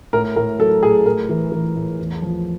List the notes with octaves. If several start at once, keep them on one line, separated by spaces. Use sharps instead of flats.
A2 A#4
A2 A#4
F#3 A4
A2 G#4
A2 A#4
E3
E3
A2
E2
F3